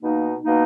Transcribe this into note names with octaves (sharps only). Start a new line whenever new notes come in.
B2 A#3 D#4
B2 A#3 D#4